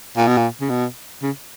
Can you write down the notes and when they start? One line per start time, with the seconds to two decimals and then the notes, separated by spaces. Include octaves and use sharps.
0.17 A#2
0.27 B2
0.37 A#2
0.61 C#3
0.69 B2
1.22 C#3